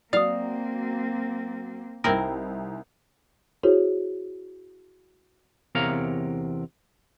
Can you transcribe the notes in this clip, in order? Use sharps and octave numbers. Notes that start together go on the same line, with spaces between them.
F#3 A#3 C4 D5 F5 D#6
C2 C4 D#4 E4 A#4
E4 F#4 G#4 C5 C#5
E2 C3 A#4 C#5 F5 A#5